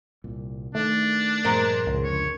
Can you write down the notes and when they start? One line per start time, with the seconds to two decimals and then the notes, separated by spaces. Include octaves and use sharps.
0.24 C2 A#2
0.75 D#3 A3 D4
1.44 G2 A#2 F3 G#3 A#4 C5
1.87 C#2
2.03 F2 D3 C#5